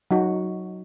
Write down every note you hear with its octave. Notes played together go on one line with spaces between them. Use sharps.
F#3 D#4 F#4